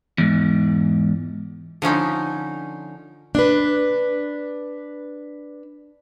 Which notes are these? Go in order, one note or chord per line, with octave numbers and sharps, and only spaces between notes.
E2 G#2
D3 F3 C#4 D#4
D4 B4